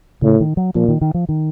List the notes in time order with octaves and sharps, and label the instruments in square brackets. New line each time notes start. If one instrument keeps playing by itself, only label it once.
[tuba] A2 [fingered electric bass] C#3
[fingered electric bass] D#3
F#3
[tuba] A#2 [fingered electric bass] F3
[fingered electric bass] D#3
D#3
F3
D#3